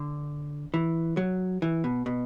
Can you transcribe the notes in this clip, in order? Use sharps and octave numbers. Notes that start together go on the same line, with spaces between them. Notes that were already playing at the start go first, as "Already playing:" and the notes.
Already playing: D3
E3
F#3
E3
B2
B2